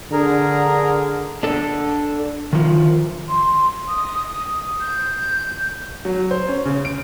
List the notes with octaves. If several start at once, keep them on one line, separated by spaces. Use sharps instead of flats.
D3 G#4 A#4 A#5
D4 A4
D#3 F3
C6
D#6
G6
F#3
C5
C#4
C#3
D7